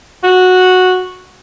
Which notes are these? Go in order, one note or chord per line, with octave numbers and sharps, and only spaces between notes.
F#4